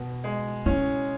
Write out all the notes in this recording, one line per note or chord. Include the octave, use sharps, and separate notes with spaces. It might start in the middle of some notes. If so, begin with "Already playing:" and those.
Already playing: B2
G#3
C#4 E4